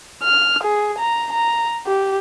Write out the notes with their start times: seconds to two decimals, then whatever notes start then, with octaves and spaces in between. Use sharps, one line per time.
0.23 F6
0.64 G#4
0.99 A#5
1.33 A#5
1.86 G4